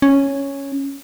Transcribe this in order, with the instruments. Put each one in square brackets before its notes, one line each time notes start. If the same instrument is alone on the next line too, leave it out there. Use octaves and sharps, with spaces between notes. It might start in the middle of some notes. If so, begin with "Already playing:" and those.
[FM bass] C#4